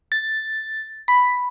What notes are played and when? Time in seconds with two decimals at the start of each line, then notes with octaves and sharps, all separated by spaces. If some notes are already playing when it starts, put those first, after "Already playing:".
0.12 A6
1.08 B5